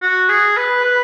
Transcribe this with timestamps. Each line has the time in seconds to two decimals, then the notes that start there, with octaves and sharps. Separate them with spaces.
0.02 F#4
0.29 G#4
0.57 B4
0.84 B4